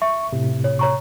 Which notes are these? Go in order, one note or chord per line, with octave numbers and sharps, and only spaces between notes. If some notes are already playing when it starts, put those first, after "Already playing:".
E5 C#6
A2 C3
C#5
C#5 A#5 C#6